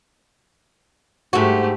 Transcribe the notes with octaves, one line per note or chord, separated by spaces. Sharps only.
G#2 A3 F#4 G4